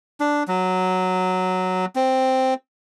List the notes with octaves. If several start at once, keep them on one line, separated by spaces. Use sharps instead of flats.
D4
F#3
C4